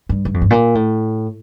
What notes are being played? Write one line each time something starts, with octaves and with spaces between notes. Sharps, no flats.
G2
G2
F2
G2
A#2
A2